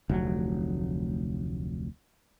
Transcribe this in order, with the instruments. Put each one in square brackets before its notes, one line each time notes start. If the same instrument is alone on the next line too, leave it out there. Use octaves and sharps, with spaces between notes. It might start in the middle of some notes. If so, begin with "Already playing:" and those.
[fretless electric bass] F1 D2 F#3